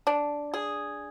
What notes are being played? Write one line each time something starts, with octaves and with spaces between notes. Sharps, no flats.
D4
G#4